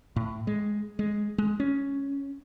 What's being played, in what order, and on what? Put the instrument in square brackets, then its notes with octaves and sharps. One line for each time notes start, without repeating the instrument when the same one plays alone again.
[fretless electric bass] A2
G#3
G#3
G#3
C#4